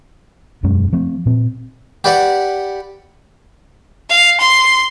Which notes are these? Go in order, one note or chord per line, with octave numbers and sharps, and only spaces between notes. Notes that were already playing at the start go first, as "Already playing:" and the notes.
E1 F#2 G#3 C#4
F3 A3 C4
A#2 C4
G4 B4 D5 F#5
F5
C6